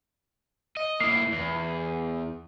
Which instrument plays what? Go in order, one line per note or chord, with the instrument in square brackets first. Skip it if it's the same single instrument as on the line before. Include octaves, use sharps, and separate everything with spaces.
[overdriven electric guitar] D#5
[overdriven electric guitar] A#3 E4 [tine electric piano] C7
[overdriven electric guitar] E2